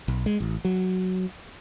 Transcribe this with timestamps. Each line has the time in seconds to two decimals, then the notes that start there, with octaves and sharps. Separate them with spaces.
0.08 B1
0.26 G#3
0.40 A1
0.65 F#3